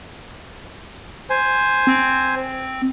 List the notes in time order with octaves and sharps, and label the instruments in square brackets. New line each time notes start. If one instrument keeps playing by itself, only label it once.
[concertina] C5 G#5
[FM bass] C4